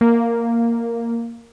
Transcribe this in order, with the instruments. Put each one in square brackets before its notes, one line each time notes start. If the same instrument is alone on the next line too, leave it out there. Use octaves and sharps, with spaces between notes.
[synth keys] A#3